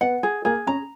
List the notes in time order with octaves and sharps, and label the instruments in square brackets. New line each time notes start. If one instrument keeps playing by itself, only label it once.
[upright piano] B3 [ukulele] F#5
[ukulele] G#4
[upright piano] A#3 [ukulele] G#4
[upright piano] C#4 [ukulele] A#5